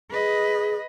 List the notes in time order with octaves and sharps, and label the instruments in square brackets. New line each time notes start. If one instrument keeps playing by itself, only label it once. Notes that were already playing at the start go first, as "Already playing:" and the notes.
[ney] G#4 [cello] B4 D#5